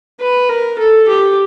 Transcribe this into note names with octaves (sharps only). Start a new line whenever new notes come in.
B4
A#4
A4
G4